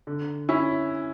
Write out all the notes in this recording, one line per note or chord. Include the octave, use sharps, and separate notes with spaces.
D3
C#4 E4